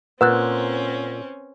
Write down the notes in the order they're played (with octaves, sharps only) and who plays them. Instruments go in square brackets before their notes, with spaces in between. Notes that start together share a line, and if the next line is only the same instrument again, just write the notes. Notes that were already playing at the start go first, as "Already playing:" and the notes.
[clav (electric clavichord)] A#2 [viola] C4 C#4 [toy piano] B4 [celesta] F#5 E6 F#6